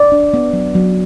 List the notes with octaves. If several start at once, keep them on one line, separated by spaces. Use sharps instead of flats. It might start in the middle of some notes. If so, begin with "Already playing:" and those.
Already playing: D5
D4
B3
F#3
F#3